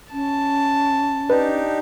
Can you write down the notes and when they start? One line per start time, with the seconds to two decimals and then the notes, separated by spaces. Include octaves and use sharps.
0.12 C#4 A5
1.30 D4 D#4 G4 B4